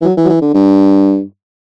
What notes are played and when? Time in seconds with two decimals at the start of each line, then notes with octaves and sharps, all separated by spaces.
0.01 E3
0.05 F#3
0.17 E3
0.25 F#3
0.29 E3
0.41 D3
0.54 G2